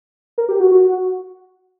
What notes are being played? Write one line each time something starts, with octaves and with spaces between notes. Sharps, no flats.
A#4
G4
F#4
F#4